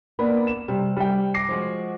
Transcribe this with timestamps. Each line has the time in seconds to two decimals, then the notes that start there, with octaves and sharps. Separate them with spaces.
0.19 A#3 B3 D4 B5
0.47 E7
0.68 C3 G3
0.97 G3 G5
1.34 D6 A#6 C7
1.49 F3 G#3 F#4